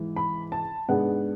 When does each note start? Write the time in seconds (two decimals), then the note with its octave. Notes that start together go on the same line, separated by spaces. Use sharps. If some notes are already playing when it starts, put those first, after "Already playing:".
Already playing: G#2 E3
0.17 B5
0.52 A5
0.88 G#2 G#3 B3 D4 F#5